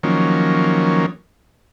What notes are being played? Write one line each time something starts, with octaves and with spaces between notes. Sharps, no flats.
D#3 F3 F#3 A#3 C#4